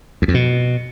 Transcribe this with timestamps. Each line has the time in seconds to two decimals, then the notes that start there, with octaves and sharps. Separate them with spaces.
0.22 E2
0.28 F2
0.34 B2